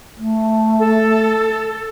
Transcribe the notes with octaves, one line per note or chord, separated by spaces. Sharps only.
A3
A4